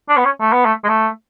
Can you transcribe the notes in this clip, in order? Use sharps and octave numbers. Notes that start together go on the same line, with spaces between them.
D4
B3
C#4
A3
B3
A3
G#3
A3